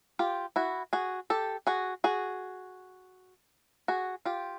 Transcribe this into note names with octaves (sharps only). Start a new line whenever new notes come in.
F4 G4
E4 F#4
F#4 G#4
G4 A4
F#4 G#4
F#4 G#4
F#4 G#4
F4 G4